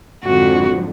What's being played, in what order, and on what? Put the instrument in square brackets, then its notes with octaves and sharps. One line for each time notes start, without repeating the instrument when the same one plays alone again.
[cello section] F2 G#2 D3 [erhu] F#4